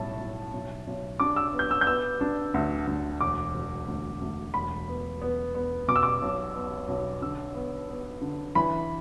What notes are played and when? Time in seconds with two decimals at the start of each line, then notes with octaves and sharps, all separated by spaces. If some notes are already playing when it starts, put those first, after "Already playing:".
Already playing: B1 A2 G3 A5
0.20 B1
0.53 B1
0.87 B1
1.20 D4 D6
1.36 E6
1.53 B3
1.59 G6
1.71 E6
1.81 G6
1.86 B3 E6
2.21 D4
2.54 D2
2.87 D2
3.21 E1 D6
3.54 E1
3.88 D2
4.21 D2
4.54 E1 B5
4.88 B3
5.22 B3
5.55 B3
5.88 B2 D6
5.96 E6
6.03 D6
6.22 B1
6.54 B3
6.88 B1
7.22 D3 E6
7.55 B3
7.89 B3
8.21 D3
8.55 E3 B5